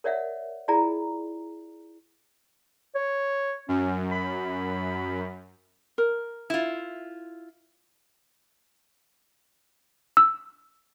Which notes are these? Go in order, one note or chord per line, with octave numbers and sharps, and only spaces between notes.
A#4 C#5 D5 E5 F#5
E4 F4 G#4 D5 A#5
C#5
F#2 C#4
B5
A#4
E4 F4
E6